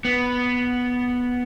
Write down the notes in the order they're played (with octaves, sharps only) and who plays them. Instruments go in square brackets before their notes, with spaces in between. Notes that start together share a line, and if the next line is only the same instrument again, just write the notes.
[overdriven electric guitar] B3